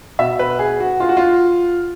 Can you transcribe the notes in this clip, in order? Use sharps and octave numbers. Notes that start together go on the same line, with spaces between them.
B2 E5
B4
G#4
F#4
F4
F#4
F4